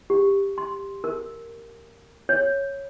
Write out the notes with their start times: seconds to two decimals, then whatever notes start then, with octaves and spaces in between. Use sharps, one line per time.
0.10 G4
0.58 C6
1.04 A#4
2.29 C#5